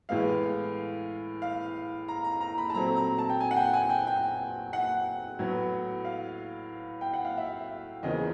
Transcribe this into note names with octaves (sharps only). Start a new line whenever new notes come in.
A2 E3 G#3 B3 F5
F5
A#5
A#5
A#5
B5
A5
A#2 F#3 A3 C4 A#5
A#5
A5
G5
G#5
F#5
G5
G#5
G5
G5
F#5
A2 F#3 B3
F5
G5
F#5
F5
E5
E2 C#3 F3 A#3 D#5